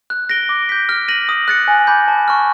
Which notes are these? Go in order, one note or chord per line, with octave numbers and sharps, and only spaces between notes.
F#6
A#6 D7 G7
D6
G6 B6
F6
A#6 D#7 F#7
D#6
F#6 A6 C#7
G#5
B5 D6 G6 A#6
A5
C#6 F6